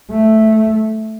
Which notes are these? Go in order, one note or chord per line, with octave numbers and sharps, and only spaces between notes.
A3